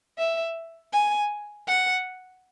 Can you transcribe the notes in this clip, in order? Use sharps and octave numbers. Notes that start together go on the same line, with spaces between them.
E5
G#5
F#5